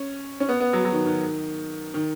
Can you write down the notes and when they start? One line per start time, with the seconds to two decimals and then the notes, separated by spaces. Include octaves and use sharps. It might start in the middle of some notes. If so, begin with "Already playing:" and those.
Already playing: C#4
0.40 C#4
0.49 B3
0.60 B3
0.73 F#3
0.85 F#3
0.93 D#3
1.06 D#3
1.94 D#3